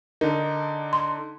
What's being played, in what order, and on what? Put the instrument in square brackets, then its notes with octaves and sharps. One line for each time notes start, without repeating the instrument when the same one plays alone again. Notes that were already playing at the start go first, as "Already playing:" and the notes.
[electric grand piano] D3 D#4 [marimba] A#4
[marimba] C6